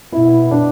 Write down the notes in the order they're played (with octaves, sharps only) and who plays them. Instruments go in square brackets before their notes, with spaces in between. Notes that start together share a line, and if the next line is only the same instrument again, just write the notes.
[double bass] B2 [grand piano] E4
[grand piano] D4